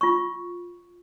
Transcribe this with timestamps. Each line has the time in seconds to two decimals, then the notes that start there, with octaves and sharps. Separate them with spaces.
0.01 F4 C#6